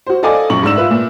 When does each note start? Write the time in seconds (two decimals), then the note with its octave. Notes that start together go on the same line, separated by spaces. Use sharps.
0.07 F#4 C5
0.23 A4 D5 D#5 F5 G#5 D6
0.50 A#1 F#2 C#6 F#7
0.63 G#2 D4 E6 E7
0.76 F4 B4 E5
0.91 A#2